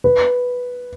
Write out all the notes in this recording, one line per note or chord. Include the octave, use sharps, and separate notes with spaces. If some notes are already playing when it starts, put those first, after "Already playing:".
B4